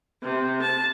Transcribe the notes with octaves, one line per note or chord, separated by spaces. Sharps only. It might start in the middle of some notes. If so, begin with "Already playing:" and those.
C3
A5